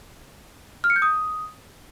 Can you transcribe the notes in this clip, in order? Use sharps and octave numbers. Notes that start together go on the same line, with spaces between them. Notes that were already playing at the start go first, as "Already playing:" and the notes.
F6
C#7
G6
D#6